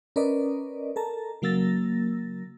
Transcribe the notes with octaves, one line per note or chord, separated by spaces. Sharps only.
C#4 A#4 B4 D5 D#5
A4 A#4 A5 A#5
C#3 F#3 A#3 E6 A6 A#6